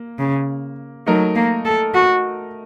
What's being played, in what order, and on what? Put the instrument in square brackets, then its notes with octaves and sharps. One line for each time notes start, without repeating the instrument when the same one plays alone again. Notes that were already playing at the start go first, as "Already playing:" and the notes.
Already playing: [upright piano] A#3
[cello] C#3
[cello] F#3 [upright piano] A3 D#4 A#4
[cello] A#3
A4
F#4